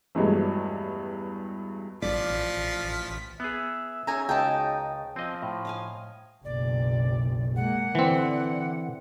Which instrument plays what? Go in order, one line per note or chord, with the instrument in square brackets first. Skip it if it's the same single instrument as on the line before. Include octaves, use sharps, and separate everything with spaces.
[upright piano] E2 G2 F#3 G#3 A3
[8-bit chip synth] A1 B6 [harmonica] F3 [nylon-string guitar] D5
[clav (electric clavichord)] B3 G#4 [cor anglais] E5
[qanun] C#4 G#4 [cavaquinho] D#4 G#5 A#5
[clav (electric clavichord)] C#2 [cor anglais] D#4 [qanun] F#4 G#4 [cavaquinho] G5 A5
[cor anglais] F3 [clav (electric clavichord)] C4 D#5
[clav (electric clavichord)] A2
[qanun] D#5 F5 G#5
[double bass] F#1 B1 [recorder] D5
[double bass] G#3 A#3 [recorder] F#5
[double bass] D3 [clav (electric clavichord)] E3 C4